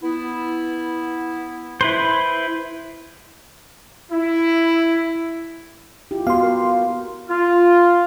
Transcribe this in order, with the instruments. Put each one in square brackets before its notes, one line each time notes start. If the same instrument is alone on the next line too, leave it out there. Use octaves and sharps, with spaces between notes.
[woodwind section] B3 E4
[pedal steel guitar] E4 B4 C5
[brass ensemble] E4
[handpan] E4 F4 G4
[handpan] B3 F#4 [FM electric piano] F5 C6
[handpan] A#4
[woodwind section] F4